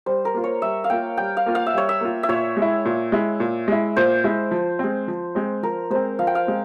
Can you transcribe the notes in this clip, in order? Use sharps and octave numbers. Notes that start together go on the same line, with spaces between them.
G3 C5
A#4
A#3 F4
C#5
G3 E5
F5
A#3 F4 G5
G3 G5
F5
A#3 F4
F5
E5
G3 C#5
E5
A#3 F4
E5
A#2 C#5
G#3
E4
A#2
G#3 E4
A#2
G#3 E4
A#2 C5
G#3 E4
F3
G#3 C4
F3
G#3 C4
F3 A#4
G#3 C4 C5
F3 F5
G5
F5
G#3 C4